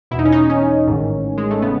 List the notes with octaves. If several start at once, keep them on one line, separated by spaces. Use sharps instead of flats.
E2 B2 D#4 E4
C#4
D#4
C#4
A1 G#2 D#3
G#3
A3
C#3 B3